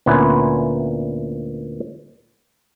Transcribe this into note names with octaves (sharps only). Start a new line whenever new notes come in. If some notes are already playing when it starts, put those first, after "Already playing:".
D2 A#2 B3 C#4 E4 B4